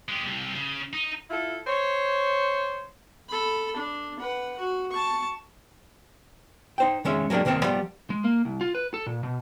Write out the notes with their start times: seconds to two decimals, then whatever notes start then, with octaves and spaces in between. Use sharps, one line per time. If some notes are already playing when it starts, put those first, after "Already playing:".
0.09 G#3 G4
0.26 C2 C3
0.55 C#3
0.93 D#4
1.30 E4 F4 A4
1.67 C5 C#5
3.29 A4 B5
3.76 D4
4.20 B4 F#5
4.59 F#4
4.91 A5 C#6
6.78 D#4 C5 G5
7.05 D#3 G#3 C#4 E5
7.30 F#3 G#3 A#3 D4 G4
7.45 C2 D#3 A#3 C4 A5
7.63 F3 G3 B3 G4
8.10 G#3
8.24 A#3
8.45 C2
8.61 F4
8.75 B4
8.94 A4
9.06 A#2
9.23 B2